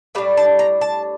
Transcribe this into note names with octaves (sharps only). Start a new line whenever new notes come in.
A2 G3 D4 F5
A5
A#5
A5